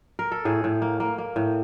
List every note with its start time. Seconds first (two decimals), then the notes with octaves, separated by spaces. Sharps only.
0.19 A#4
0.32 A4
0.45 A2 G#4
0.64 A2
0.82 A#3
1.00 A#3
1.18 A#3
1.36 A2